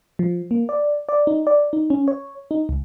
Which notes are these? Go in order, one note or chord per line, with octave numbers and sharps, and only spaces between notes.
F3
A#3
D5
D5
D#4
D5
D#4
C#4
C#5
D#4
C#2